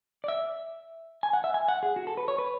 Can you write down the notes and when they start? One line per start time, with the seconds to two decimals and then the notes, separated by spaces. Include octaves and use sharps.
0.24 D5
0.28 E5
1.23 G#5
1.33 F#5
1.44 E5
1.54 G#5
1.68 F#5
1.83 G#4
1.96 F#4
2.07 A4
2.17 B4
2.28 C#5
2.38 B4